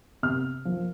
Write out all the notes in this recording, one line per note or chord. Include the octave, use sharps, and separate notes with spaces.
C3 F6
F3 A#3